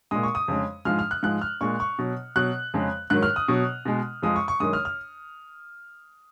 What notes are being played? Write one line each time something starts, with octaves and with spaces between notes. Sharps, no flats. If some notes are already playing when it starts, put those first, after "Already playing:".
A#2 G#3 D#6
C#6
D#6
F2 C#3 G#3
G#2 F3 G#3 F6
F6
F#6
G#2 F3 G#3 F#6
F6
A#2 G#3 C#6
C#6
B2 F#3
B2 F#3 F#6
F2 C#3 G#3
G#2 D#3 F#3 F#6
F6
D#6
B2 F#3
B2 G#3
F2 F3 G#3 D#6
C#6
C#6
F#2 D#3 G#3 D#6
F6
F6